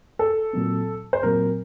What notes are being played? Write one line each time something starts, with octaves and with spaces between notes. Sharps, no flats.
A4
A#2 F#3 C4
C5
A#2 F#3 C4 A#4